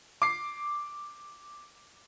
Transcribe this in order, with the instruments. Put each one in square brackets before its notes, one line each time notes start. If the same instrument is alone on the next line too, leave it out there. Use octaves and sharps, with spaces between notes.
[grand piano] D6 C7